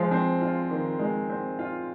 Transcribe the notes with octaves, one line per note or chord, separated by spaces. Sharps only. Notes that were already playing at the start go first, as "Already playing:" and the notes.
Already playing: F3 G#3
C4
F4
D#3
G#3
C4
F4